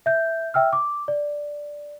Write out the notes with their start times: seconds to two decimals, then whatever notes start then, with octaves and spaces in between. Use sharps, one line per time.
0.06 E5 G6
0.54 E5 G5 E6 F6
0.73 D6
1.08 D5